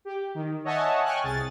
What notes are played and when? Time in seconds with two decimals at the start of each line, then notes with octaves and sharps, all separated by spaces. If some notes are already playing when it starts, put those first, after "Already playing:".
0.05 G4
0.34 D#3
0.64 C#5 D#5 E5 F#5 G#5 A5
1.04 G5 G#5 C#6 F6 F#6
1.23 C2 G#4 A6